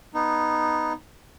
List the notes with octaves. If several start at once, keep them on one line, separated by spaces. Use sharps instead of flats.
B3 D#4